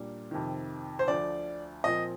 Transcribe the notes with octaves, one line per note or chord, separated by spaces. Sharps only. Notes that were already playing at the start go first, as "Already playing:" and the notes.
Already playing: A#2 G3 A#3 D4
F2 C3 D#3
C5
D2 D3 F3 D5
A#2 F3 C4 D#5